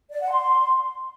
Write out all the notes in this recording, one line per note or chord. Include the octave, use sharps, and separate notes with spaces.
D5
F#5
C6